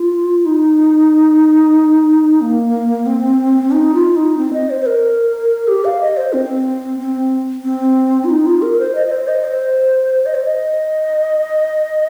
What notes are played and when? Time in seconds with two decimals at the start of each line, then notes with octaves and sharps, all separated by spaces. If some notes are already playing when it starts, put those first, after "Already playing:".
Already playing: F4
0.45 D#4
2.41 A#3
3.06 C4
3.71 D#4
3.94 F4
4.16 D#4
4.37 C4
4.53 D#5
4.70 C5
4.81 C5
4.86 A#4
5.68 G4
5.85 F5
6.01 D#5
6.17 C5
6.33 C4
7.00 C4
7.64 C4
8.25 F4
8.30 D#4
8.46 F4
8.62 A#4
8.79 C5
8.95 D#5
9.07 D#5
9.12 C5
9.28 D#5
9.44 C5
10.26 D#5
10.35 C5
10.45 D#5